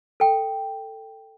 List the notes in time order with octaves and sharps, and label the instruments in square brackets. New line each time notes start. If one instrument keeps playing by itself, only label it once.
[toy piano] A4 G5